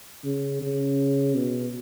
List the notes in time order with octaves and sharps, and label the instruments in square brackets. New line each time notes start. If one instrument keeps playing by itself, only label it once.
[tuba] C#3
C#3
B2